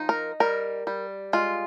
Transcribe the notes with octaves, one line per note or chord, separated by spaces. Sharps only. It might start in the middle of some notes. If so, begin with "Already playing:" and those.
Already playing: F3 D#4
A#4
G3 A#4
G3
G#3 F4